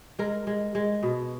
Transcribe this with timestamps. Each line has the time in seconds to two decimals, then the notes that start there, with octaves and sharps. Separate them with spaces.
0.19 G#3 A#4
0.47 G#3
0.75 G#3
1.03 B2